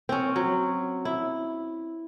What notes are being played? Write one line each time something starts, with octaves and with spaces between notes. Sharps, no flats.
C4 C#4
F#3
E4